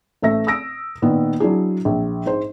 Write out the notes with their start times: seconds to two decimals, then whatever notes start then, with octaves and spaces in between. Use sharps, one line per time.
0.22 A1 A3 E5 A#6
0.47 D#6 E6 A#6 D7
1.02 A#2 D#3 B3
1.40 F#3 D4 E4 G#4
1.85 A#1
2.26 G#2 C5